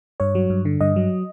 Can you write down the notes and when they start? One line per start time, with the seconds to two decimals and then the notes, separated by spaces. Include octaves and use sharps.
0.20 G2 C#5
0.35 F#3
0.50 G2
0.65 D3
0.81 G2 D#5
0.96 F#3